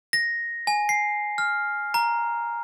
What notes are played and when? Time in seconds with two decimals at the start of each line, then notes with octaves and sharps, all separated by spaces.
0.13 A#6
0.67 G#5
0.89 C7
1.38 F6
1.94 A#5